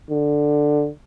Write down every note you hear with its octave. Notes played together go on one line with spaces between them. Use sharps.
D3